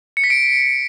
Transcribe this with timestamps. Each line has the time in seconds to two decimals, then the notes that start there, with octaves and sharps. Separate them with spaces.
0.17 C#7
0.24 B6
0.30 D7